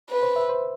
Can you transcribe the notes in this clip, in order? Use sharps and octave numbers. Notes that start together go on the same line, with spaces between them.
B4
C5
E5
C5